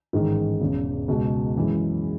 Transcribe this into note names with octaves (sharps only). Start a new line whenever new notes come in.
A1 G#2 D#3
E1 E2 C#3
C#2 B2 G#3
F#2 E3 G#3